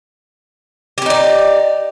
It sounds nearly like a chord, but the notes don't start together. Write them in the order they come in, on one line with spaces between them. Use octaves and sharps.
G4 C#4 D#4 D5